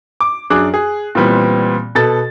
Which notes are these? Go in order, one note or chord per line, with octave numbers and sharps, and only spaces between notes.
D6
F#2 D4 G#4 D6 F#6
G#4
A#2 E3 G3 B3 C4
B2 A4 A6